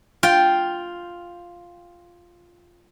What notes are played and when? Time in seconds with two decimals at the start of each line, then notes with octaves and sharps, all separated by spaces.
0.23 F4 G5